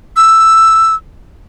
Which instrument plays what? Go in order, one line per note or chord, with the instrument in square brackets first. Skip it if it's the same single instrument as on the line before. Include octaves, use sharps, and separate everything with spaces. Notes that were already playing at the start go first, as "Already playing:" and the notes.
[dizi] E6